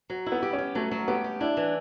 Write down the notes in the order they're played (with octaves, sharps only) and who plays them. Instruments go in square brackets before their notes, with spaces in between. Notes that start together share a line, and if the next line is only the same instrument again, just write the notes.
[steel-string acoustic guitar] F#3
E4
[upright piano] B3
[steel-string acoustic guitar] G4
[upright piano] C#4
[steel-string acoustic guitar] G4
[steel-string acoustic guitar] F#3 [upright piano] A3
[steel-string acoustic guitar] F#3
[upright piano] B3 [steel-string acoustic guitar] G4
[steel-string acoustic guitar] G4
[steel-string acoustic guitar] D4 [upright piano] E4
[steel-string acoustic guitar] E3